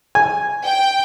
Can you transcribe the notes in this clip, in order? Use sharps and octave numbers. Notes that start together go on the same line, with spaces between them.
G#5
G5